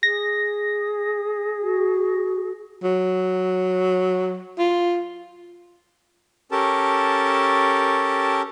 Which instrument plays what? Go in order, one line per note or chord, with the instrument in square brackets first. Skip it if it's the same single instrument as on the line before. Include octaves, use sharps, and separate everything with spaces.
[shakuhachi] G#4 [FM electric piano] A#6
[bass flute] F#4
[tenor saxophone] F#3
F4
[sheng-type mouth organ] C#4 G4 A4 A#4 A5